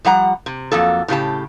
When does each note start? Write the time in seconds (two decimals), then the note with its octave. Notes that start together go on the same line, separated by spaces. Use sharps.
0.05 F3 G3 F#5 A#5
0.46 C3
0.72 F2 F#3 A#3 A4
1.08 A2 C#3 G4 A5